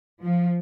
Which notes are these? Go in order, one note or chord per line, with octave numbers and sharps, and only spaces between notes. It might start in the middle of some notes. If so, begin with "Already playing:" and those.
F3